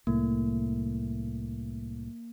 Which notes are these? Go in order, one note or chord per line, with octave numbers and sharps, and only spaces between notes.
C2 A2 A#3